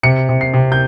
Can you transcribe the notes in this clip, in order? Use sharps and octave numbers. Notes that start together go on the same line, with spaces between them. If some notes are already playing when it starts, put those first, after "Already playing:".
C3 C#7
C3
C7
C3
G6